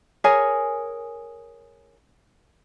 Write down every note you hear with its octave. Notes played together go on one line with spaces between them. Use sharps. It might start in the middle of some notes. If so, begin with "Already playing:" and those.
G#4 A#4 C#5 G#5